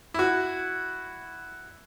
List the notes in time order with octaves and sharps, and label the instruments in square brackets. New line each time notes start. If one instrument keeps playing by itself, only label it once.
[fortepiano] E4 F#4